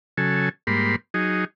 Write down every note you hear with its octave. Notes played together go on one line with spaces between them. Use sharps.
C#3 F#3 A4 G#5
G#2 G3 A#3 B5 C6
F#3 D#4 G#4